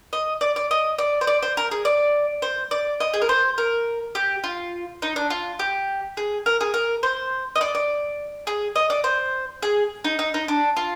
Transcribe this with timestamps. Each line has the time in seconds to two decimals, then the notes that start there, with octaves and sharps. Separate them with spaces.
0.13 D#5
0.41 D5
0.56 D5
0.71 D#5
0.98 D5
1.21 C5
1.27 D5
1.43 C5
1.57 A#4
1.71 G#4
1.85 D5
2.42 C5
2.71 D5
3.00 D#5
3.14 G#4
3.22 A#4
3.29 C5
3.58 A#4
4.15 G4
4.44 F4
5.02 D#4
5.16 D4
5.30 F4
5.59 G4
6.17 G#4
6.46 A#4
6.61 G#4
6.74 A#4
7.03 C5
7.56 D#5
7.61 D5
7.75 D5
8.47 G#4
8.76 D#5
8.90 D5
9.04 C5
9.63 G#4
10.04 D#4
10.19 D#4
10.34 D#4
10.48 D4
10.77 F4